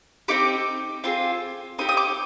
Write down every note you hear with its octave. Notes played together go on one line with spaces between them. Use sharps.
C4 D#4 G4 D6
C4 F4 G#4
C4 D#4 G4 D#6
D#6
D6